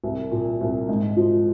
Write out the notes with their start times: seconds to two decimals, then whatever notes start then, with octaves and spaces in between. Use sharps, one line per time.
0.04 C2
0.31 A#2
0.61 C2
0.89 G#2
1.16 F3